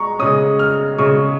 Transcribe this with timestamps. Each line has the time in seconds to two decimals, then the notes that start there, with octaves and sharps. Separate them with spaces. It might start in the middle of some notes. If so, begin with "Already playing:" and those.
Already playing: G#3 A#5 C#6
0.19 C#3 G#3 C#4 D#6
0.59 F6
0.98 C#3 G#3 C#4 C#6